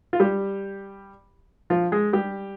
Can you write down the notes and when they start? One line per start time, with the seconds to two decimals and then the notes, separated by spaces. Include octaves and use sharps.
0.13 F4
0.20 G3 G4
1.70 F3 F4
1.92 G#3 G#4
2.13 G3 G4